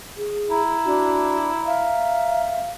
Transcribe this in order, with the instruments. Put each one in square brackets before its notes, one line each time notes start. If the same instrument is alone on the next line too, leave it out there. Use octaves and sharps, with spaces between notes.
[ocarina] G#4
[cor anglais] E4 [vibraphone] A#5
[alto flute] D4 [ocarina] F#4
[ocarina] E5 [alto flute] F5